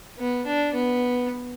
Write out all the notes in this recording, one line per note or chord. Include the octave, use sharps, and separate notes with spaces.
B3
D4
B3